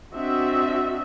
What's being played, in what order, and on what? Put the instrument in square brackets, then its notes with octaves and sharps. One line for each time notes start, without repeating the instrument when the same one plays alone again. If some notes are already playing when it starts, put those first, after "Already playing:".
[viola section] C4 D4 F#4 D#5 E5